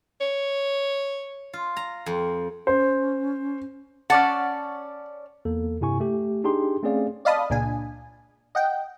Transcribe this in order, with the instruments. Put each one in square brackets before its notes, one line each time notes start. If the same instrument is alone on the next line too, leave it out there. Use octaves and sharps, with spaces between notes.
[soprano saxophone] C#5
[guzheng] F4
A#5
F2
[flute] C#4 [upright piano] C5
[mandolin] C#4 D5 A5 [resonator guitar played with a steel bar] F#5
[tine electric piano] E2 A#3 A4
G2 C3 E4 G#5 C#6
A3 G4
D4 D#4 G4 G#4 G5 C6
A3 C4 C#4 G#4 D5 F5
[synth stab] D5 D#5 F5 A5 B5 D#6
C#2 A#2 D4 G#5
D#5 F#5 G5